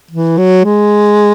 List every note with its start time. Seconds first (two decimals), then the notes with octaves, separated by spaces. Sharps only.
0.11 E3
0.38 F#3
0.65 G#3